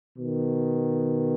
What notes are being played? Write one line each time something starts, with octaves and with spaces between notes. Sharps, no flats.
B2 D#3